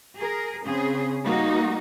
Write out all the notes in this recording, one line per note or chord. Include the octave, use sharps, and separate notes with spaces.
G#4 A#4
C#3 C4 G#4
G3 A#3 D#4 F#4